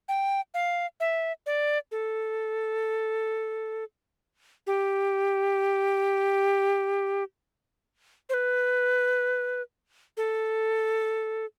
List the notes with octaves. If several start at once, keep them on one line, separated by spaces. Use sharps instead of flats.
G5
F5
E5
D5
A4
G4
C5
B4
A4